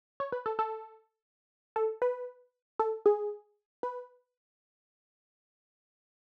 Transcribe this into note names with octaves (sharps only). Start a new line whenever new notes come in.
C#5
B4
A4
A4
A4
B4
A4
G#4
B4